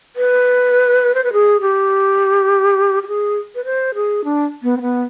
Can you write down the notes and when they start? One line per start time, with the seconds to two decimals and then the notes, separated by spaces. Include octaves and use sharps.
0.16 B4
1.15 C5
1.24 B4
1.33 G#4
1.61 G4
3.03 G4
3.08 G#4
3.55 B4
3.65 C5
3.95 G#4
4.24 D4
4.63 B3
4.77 C4
4.81 B3